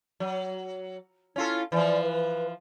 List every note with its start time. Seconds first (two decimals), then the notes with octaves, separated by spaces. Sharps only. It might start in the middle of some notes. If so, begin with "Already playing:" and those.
0.20 F#3
1.36 C#4 E4 F4 A4
1.72 E3 F3 D5
2.03 B4